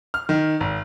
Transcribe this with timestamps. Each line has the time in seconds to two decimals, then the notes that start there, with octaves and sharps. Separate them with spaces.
0.14 F6
0.29 D#3
0.60 G#1